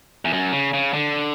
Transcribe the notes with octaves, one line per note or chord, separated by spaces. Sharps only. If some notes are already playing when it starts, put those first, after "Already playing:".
E2
F#2
C#3
C#3
D3